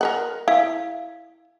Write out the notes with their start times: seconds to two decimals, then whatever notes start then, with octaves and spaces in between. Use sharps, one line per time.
0.01 A#4 B4 F#5
0.48 E4 F5